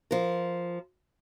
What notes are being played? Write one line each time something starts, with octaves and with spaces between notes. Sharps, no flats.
F3 A#4